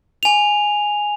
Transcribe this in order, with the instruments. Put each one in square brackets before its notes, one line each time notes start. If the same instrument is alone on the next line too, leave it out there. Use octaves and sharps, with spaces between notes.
[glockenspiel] G#5 F7